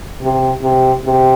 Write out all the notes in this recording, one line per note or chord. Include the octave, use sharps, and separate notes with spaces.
C3
C3
C3